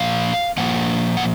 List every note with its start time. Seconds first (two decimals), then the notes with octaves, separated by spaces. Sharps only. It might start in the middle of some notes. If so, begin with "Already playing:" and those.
Already playing: A#2 F3 A#3 F5
0.57 A#2 F3 A#3 F#5
1.17 F#5